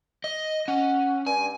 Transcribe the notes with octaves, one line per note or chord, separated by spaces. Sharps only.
D#5
C#4 F#5
G2 G#5